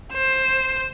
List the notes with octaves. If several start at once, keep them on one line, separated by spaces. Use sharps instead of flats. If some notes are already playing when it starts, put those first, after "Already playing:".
C5